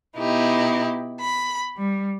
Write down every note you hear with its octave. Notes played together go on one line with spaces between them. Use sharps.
B2 D#4 E4 G4
B5
G3